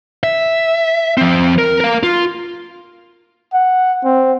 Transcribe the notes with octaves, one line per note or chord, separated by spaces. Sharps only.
E5
F3 C4
A#4
A#4 F5
F4
F#5
C4